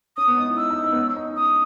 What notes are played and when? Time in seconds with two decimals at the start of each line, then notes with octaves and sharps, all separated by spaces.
0.17 C#4 D#6
0.28 B3
0.37 D#4
0.47 E4
0.57 D#4 E6
0.70 D#4
0.84 D#4
0.92 B3
0.97 C#4
1.16 D#4
1.36 D#4 D#6